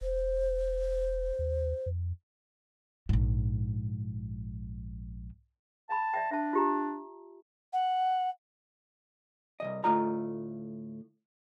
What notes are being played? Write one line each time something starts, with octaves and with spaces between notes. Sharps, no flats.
E1 C5
D#2
F2
A#1 G#2
F5 G#5 A5 B5
D5 E5 G5
D4 E5 A5
F4 G4 A#5
F#5
C2 C3 D#5
D2 A2 A3 F4 D#5 A#5